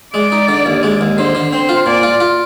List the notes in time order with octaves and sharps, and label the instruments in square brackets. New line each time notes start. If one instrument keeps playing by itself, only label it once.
[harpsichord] G#3 [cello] D5
[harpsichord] D#4
D3
D#2
G#3
D#2
[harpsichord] D3 [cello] C5
[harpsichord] D3
[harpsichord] C4 [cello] C5
[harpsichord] F4
[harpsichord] A#2 [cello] D5
[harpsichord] F4
F4